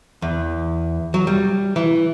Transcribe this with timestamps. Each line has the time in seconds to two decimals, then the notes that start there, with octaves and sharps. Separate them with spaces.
0.22 E2
1.14 F#3
1.27 G3
1.76 E3